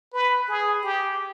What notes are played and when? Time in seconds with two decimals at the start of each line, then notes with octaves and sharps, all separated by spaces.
0.14 B4
0.49 G#4
0.83 G4